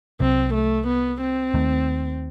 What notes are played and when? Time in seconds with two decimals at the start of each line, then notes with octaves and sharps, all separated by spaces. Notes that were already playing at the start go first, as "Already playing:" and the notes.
0.20 C2 C3 F#3 C4
0.54 A3
0.87 B3
1.21 C4
1.54 D#2 D#3 A3